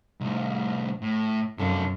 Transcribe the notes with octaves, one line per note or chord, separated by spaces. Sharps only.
C2 A2
A2
F#2 C3 A4